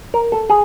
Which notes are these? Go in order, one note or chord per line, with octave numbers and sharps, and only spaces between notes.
A#4
A4
G#4